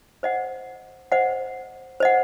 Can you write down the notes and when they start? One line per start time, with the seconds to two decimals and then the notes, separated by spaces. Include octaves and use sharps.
0.23 C5 D#5 F#5
1.12 C5 D#5 F#5
2.00 C5 D#5 F#5